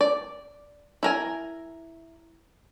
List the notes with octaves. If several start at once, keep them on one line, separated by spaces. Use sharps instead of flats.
D5
E4 A#4 G#5